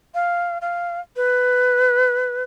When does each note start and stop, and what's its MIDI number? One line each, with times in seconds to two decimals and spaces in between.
0.15 0.58 77
0.62 1.00 77
1.16 2.43 71